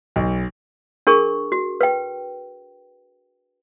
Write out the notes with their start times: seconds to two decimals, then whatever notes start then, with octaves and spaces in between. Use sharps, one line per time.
0.16 B1
1.07 D4 G#4 A#4 C#6
1.52 F#4
1.81 B4 G5